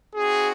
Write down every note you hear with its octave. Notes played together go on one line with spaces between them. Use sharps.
C4 D#4 F#4 G#4